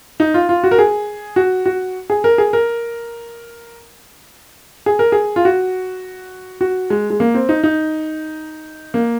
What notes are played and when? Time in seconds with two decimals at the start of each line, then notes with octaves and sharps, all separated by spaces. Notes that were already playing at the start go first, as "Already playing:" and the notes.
0.20 D#4
0.34 F4
0.49 F4
0.64 F#4
0.71 A#4
0.79 G#4
1.36 F#4
1.66 F#4
2.10 G#4
2.24 A#4
2.38 G#4
2.53 A#4
4.86 G#4
4.99 A#4
5.12 G#4
5.36 F4
5.45 F#4
6.61 F#4
6.90 G#3
7.10 G#3
7.20 A#3
7.34 C4
7.49 D#4
7.63 D#4
8.94 A#3